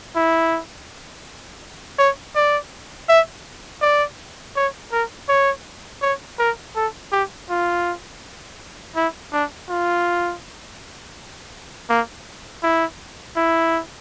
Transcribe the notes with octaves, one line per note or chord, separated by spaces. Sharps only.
E4
C#5
D5
E5
D5
C#5
A#4
C#5
C#5
A#4
A4
G4
F4
E4
D4
F4
A#3
E4
E4